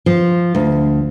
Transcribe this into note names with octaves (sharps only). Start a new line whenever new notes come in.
F3
D2